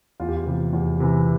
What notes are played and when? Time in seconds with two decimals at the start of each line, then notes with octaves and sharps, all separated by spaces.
0.20 E2 F4
0.29 G4
0.37 F4
0.46 C3 E3
0.73 E2
1.00 C3 E3